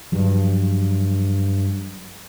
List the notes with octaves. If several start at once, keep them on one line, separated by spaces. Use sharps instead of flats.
G2 F3 F#3